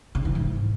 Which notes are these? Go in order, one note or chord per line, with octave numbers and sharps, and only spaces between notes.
C#3
E3
G#2